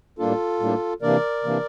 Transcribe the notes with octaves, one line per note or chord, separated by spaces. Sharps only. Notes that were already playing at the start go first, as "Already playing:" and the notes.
A2 G3 A#3 D4 F4 A4
A2 G3 A#3 D4
C3 E3 A#3 D4 A#4 D5
C3 E3 A#3 D4